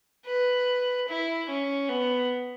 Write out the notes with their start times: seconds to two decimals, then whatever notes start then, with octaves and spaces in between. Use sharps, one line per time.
0.26 B4
1.08 E4
1.49 C#4
1.89 B3